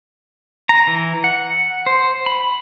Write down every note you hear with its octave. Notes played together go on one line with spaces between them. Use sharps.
A#5
E3
F#5
C5
B5